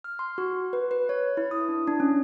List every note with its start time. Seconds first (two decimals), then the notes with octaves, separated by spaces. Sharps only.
0.04 F6
0.19 C6
0.38 F#4
0.73 B4
0.91 B4
1.09 C#5
1.37 E4
1.51 D#6
1.68 D4
1.87 D4
2.00 C#4